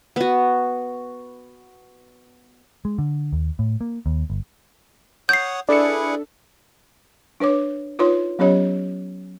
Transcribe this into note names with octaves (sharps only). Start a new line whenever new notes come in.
B3 F#4
G#3
D3
D#2
A2
A#3
D#2
G1
C#5 F#5 D#6 G6 C7
D4 E4 G#4 A4 B4 D5 E5 C#7
D4 B4 C#5 D6
D#4 F4 B4 C#5 C6
F#3 B3 C#4 G4 C#5 D#5